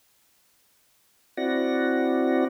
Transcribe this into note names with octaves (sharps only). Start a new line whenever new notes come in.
C4 E4 F#4 D5 F#5 A#6